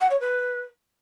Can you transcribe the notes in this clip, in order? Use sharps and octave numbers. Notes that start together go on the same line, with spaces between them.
F#5
C#5
B4